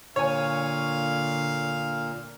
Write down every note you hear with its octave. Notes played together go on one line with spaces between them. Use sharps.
A#2 D3 C#5 F5 G#5